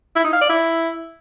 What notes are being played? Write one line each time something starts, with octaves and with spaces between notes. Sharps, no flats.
E4
D#4
F5
D5
E4